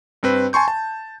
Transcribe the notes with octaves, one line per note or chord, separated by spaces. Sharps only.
G2 C4 B4
G#5 A5 C6 C#6 G6
A5